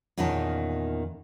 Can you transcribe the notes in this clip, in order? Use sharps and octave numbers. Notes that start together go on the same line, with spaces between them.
E2 A#2 D#3 C#4 F4 A5